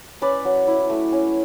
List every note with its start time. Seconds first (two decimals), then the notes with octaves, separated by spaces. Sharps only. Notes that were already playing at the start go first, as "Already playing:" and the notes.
0.22 C#4 B4 D5
0.45 F#3
0.67 E4
0.90 A3
1.12 C#4